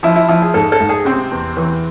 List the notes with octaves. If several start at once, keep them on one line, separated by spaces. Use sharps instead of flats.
F3 E4
E4
F3 E4
G#4
G#2 A4
A4
G#2
G#4
C3 C4
E2
E3